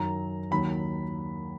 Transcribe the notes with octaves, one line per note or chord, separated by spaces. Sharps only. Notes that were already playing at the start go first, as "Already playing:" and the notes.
Already playing: F#2 D#3 F#3 A#5
D#2 D#3 F#3 B5